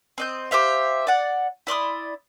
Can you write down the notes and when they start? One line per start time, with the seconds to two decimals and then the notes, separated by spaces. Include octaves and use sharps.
0.18 C4 D#5 G6
0.51 G4 C5 E5 F5
1.07 D5 F#5
1.67 E4 D5 C6 D#6